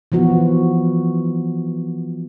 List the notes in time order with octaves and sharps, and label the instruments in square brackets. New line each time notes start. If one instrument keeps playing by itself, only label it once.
[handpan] E3 F3 B3 F#4